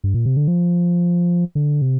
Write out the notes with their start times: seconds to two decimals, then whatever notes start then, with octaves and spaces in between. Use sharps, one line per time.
0.04 G2
0.14 A#2
0.26 C3
0.37 D3
0.48 F3
1.55 D3
1.82 C3